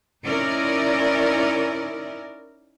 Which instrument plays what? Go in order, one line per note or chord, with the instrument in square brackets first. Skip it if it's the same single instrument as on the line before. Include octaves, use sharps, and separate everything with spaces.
[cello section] C#4 D#4 E4 A#4 D5